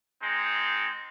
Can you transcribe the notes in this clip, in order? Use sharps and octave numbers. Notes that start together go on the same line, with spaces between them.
G#3 C4 D#4